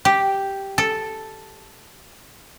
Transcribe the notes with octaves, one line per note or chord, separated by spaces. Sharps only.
G4
A4